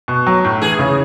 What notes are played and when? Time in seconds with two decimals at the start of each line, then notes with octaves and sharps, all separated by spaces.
0.08 B2
0.27 F#3
0.45 A2
0.62 E3 G#4
0.79 C#3